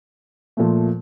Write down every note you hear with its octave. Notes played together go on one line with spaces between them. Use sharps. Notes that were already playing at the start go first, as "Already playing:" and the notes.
A#2 F3 A3